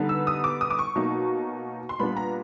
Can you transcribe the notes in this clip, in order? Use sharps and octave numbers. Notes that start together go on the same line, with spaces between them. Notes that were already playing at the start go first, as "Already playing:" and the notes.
Already playing: D3 G3 B3 D#4
E6
D#6
D6
D#6
D6
C#6
B2 F#3 A#3 D#4
C6
A#2 G3 B3 D4 B5
A#5